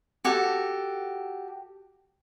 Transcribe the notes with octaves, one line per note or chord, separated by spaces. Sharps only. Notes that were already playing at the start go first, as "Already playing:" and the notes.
F#4 G4 A4